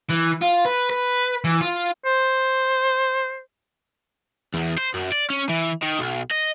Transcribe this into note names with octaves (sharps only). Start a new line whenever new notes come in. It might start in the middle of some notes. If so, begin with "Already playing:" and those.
E3
F4
B4
B4
E3
F4
C5
E2
C5
F#2
D5
C#4
E3
D#3
B1
D#5